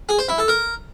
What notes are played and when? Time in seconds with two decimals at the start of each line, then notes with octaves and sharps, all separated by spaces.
0.09 G#4
0.19 C5
0.28 E4
0.38 A4
0.48 A#4